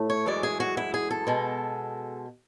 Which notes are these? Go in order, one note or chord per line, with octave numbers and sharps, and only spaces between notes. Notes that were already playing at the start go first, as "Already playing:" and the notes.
Already playing: A2 A3
C#5
F#2 E3 G#3 D5
G#4
F#4
E4
G#4
A4
B2 G#3